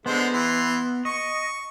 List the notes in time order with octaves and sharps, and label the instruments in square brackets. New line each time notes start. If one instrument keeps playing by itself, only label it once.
[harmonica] D3 G#3 C5 [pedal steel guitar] B3
[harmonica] E3 C6
[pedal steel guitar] D#5 [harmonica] C#6